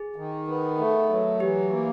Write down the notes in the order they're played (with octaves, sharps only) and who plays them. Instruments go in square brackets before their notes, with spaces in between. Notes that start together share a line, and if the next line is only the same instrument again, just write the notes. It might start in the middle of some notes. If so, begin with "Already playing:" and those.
Already playing: [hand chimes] G#4
[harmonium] D#3
B3
A3
F#3
[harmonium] E3 [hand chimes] G4
[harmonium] A#3